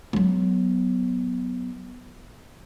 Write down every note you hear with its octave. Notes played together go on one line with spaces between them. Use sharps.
F#3 B3